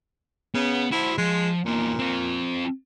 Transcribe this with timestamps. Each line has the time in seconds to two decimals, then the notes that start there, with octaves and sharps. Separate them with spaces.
0.55 C#3 B3
0.92 E4 F#4 C5
1.18 F3 G#3
1.66 E2 A#2 A#3
1.99 C4 F4